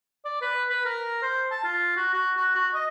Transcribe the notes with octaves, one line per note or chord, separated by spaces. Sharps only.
D5
B4
B4
A#4
C5
A5
F4
F#4
F#4
F#4
F#4
D#5